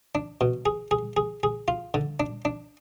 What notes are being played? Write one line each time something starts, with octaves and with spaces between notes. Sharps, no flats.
D4
B2
G#4
G#4
G#4
G#4
F4
D3
D4
D4